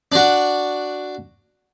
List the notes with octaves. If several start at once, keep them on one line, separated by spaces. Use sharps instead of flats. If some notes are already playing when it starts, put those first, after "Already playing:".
D4 F#4